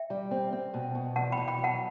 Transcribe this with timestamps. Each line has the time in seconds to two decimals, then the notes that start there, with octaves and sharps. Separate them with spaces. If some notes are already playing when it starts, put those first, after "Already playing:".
Already playing: E5 G5
0.10 G3
0.31 C4
0.53 C4
0.74 B2
0.95 B2
1.16 E2 F#5 A5
1.32 G5 B5
1.37 B2
1.48 G5 B5
1.59 F#3
1.64 F#5 A5